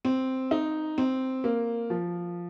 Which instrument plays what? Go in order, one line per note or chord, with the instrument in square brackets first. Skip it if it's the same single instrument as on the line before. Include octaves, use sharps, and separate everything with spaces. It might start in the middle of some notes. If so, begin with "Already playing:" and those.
[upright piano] C4
D#4
C4
A#3
F3